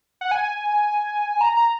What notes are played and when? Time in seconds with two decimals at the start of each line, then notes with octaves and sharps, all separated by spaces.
0.21 F#5
0.31 G#5
1.41 A#5
1.57 A#5